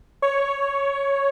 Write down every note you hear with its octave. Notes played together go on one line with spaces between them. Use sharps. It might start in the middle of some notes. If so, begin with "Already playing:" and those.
C#5